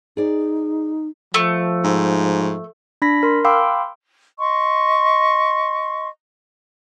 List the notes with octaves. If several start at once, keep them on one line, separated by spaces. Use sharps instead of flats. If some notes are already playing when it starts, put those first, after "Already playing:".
D#4 G#4 D5
F3 A3
G#2
D4 B5 A#6 B6
A#4 C6
F5 G5 B5 C6 D6 E6
D#5 C6 C#6